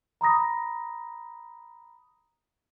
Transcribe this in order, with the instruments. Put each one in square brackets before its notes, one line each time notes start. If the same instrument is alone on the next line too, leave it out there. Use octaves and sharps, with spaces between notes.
[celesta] A#5 B5 D#6 A#6